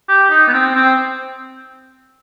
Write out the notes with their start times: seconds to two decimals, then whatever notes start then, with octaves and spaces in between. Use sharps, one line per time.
0.08 G4
0.30 D#4
0.48 B3
0.53 C4
0.75 C4